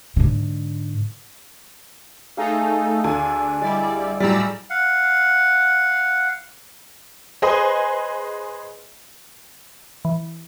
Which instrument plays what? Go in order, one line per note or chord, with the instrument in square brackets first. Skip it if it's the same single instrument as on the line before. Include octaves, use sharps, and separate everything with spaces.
[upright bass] G#2 D3
[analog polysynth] A3 D#4 A4 [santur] G#4 F5
[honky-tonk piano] D2 G#5 [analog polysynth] D4 [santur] G#4 A4
[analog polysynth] G3 E4 D5 [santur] G#3
[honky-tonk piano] A2 F#3 G3 [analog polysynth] D5 A#5 E6
[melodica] F5 F#5
[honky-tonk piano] G#4 B4 C5 D#5 G#5
[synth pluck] E3